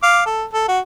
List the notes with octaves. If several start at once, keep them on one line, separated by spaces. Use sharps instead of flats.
F5 D6
A4
A4
F#4